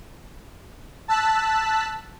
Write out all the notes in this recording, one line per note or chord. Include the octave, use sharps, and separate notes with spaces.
A5 E6 F#6 B6